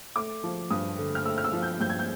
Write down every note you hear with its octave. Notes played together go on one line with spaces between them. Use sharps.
A3 D6
F3
G2 D#6
D3
F6
A3 E6
F6
E6
F3
G6
G2 G6
G#6
G6